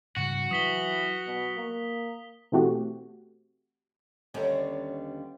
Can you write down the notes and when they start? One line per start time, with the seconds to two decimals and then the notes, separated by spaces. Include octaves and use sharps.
0.16 G#2 C#3 G3 F#4
0.51 E3 F#3 D#6 B6 G7
1.27 B2
1.56 A#3
2.52 B2 E3 A3 C4 F#4 G4
4.34 D#2 D3 G3 B3 C#4 F5